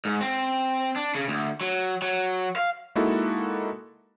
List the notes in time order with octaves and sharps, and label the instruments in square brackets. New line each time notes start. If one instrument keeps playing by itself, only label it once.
[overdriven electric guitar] G#2
C4
D4
C#3
D2
F#3
F#3
F5
[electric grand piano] G#3 A#3 D#4 E4 F#4 A4